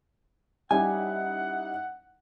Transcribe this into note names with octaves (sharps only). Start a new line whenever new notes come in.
G3 C#4 D#4 E4 G4 F#5 G#5